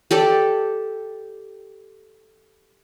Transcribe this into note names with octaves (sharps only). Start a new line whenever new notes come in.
G4 A4 D5